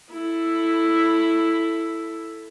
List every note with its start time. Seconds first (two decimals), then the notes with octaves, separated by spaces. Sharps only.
0.11 E4 A4